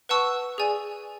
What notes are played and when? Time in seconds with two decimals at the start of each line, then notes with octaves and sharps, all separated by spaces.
0.09 B4 F#5 A5 C#6 E6
0.58 G#4 D5 G#5